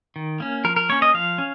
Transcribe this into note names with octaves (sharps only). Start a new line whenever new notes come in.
D#3
A#3 C#4
F3 A#4
A#4
A#3 C#4 C#5
D#5
F3 F5
C#4